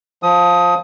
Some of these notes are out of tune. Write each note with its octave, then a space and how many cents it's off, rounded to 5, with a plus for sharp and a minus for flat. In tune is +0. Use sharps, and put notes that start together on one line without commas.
F3 +10 D#6 +15